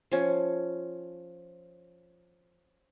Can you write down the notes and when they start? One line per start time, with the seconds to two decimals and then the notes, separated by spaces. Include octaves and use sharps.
0.12 F3 C#4